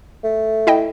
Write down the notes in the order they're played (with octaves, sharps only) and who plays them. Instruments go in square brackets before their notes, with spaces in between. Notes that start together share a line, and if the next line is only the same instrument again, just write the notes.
[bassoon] A3
[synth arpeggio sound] E4 D#5 G5